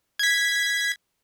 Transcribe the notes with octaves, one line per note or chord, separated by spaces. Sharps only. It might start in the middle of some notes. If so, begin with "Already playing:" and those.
G#6 B6